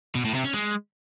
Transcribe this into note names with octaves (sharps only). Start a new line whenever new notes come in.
B2
A2
C3
C#4
G#3